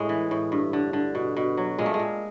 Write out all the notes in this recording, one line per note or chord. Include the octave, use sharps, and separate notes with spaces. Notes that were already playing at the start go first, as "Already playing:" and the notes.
Already playing: A2 G#3
E3
A2
G2
D3
D3
B2
B2
F#3
A#2 G#3
A3
G#3
A#2